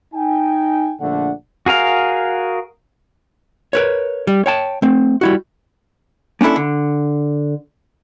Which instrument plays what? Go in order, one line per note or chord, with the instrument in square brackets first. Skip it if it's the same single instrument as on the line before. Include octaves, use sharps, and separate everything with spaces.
[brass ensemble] D#4 G5 G#5
A#1 D3 A3 D4 F#5
[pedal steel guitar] F#4 G#4 A#4 F5
[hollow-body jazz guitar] A#4 B4 C#5
G3
C#5 G5 A5
A3 C4
G3 E4 F#4
A#3 C#4 D4 E4 A4
D3